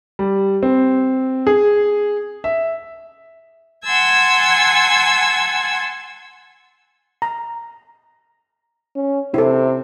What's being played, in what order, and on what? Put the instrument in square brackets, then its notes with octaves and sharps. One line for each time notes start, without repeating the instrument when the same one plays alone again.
[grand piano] G3
C4
G#4
E5
[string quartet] F#5 G#5 A5 C6 E6 G#6
[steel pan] A#5
[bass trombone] C#4
[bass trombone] C3 [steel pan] E4 A4